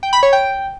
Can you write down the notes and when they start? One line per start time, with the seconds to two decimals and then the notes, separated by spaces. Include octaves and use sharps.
0.03 G5
0.13 B5
0.23 C#5
0.33 G5